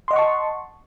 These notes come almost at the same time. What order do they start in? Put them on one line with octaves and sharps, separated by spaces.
C6 D#5 F#5 C#6 A5